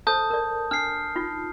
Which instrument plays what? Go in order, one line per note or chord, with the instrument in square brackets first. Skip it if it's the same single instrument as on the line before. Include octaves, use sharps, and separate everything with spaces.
[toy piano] A4 C5 [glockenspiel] A5 D#6 G6
[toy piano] A#4 D5
[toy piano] D4 [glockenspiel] F6 C7
[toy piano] D#4 F4